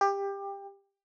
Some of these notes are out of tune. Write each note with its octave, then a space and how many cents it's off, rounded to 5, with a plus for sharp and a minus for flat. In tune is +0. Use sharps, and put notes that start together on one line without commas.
G4 +20